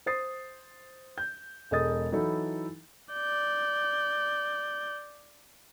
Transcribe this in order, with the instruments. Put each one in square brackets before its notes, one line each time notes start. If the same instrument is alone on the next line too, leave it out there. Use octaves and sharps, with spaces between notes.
[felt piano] C5 D#6 A6 C7
G6
E1 G#3 A4 D#5 D#6 A6
E3 F#3 D#4 E4 A4
[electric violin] D5 G6